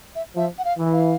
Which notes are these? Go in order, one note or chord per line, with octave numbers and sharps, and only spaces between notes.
E5
F3 E5
F#5
F5
E3
F5